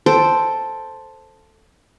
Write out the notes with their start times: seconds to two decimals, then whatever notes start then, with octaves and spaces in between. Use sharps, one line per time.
0.06 A4 C5 G5